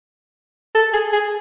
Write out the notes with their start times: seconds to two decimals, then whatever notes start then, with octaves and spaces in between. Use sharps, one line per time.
0.75 A4
0.93 G#4
1.12 G#4